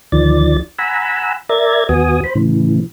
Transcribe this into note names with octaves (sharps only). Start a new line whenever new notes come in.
D2 D#3 F3 D5 A6
F#5 G#5 A#5 B5 E6
A#4 D5 E5 A#5 G#6 A6
D#2 B3 F#4 G#5 D#6
C5 B5
A2 C#3 E3